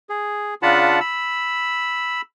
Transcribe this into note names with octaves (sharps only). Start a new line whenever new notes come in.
G#4
C#3 D4 F4 F#5 A5 B5
B5 E6